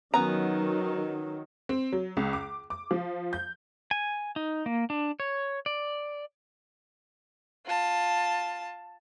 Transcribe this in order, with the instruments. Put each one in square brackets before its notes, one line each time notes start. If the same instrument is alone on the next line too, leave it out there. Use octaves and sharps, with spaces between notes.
[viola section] D#3 F#3 [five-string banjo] B3 C#4 A#5
[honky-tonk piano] C4
F#3
C#2
D6
D6
F3
G6
[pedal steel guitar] G#5
D#4
A#3
D4
C#5
D5
[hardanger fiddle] F4 A5